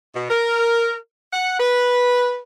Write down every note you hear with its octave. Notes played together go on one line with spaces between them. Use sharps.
B2
A#4
F#5
B4